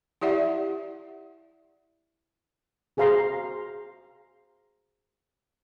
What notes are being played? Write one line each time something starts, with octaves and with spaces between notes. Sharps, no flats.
E4 G4 D5 E5 F#5
F#4 G#4 C5 F5 A#5 C6